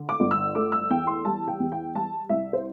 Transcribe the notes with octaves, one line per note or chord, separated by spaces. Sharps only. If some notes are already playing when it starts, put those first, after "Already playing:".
Already playing: D3
D6
G1
E6
A3 D6
E6
E2 G5
C6
G3 A5
G5
E2
G5
G3 A5
C2 E5
C5